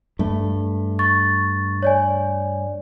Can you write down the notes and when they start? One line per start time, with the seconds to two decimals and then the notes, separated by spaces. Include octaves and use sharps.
0.19 G2 A3
0.99 C#6 A6
1.83 C#5 D5 G#5